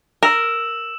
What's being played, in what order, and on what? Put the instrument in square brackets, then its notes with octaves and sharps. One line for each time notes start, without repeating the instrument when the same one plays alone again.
[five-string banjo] A#4 [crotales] E6 E7